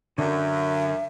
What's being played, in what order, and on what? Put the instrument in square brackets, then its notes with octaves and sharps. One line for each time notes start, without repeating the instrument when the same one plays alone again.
[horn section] F#2 [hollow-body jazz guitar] D3 [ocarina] E5